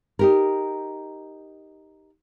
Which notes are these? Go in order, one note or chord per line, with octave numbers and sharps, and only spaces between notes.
D#4 G4 A#4